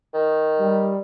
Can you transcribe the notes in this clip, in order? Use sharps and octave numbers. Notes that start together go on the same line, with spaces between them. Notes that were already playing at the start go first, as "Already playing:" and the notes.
D#3
G3